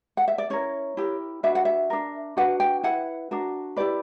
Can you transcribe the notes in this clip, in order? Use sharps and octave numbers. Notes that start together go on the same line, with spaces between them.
F#5
E5
D5
C#4 E4 A#4 C#5
E4 G4 A#4
D4 F#4 B4 E5
F#5
E5
D4 A#4
D4 F#4 B4 F#5
G5
E4 B4 F#5
D4 F#4 A#4
E4 G4 B4 D5